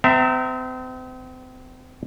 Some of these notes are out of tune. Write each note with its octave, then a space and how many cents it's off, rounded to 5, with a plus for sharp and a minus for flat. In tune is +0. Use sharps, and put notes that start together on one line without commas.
C4 -40 E5 +5 A#5 -25